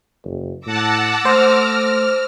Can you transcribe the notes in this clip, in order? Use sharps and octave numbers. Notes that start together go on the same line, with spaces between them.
F#1
A2 F#5 A5 D6 E6 A#6
A3 C5 F6